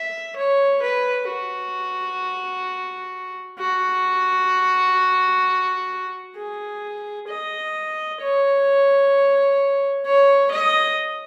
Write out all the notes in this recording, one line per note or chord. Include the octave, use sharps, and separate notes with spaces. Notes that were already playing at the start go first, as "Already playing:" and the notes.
Already playing: E5
C#5
B4
F#4
F#4
G#4
D#5
C#5
C#5
D#5